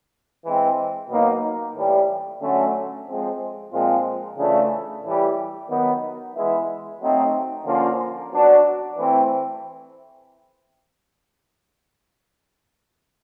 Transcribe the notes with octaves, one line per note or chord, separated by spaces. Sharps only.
E3 G#3 C4
B2 F#3 A#3 D#4
A2 E3 G3
D3 F#3 A3 C#4
F3 G#3 C4
A#2 F3 G#3 C4 F4
C#3 E3 A3 D4 F4
A2 E3 G3
D#3 F#3 B3
E3 G#3 B3 E4
F#3 A3 C4 D#4
D3 F3 A#3 C#4 F4
F#3 B3 D4 F#4
E3 A3 C4 E4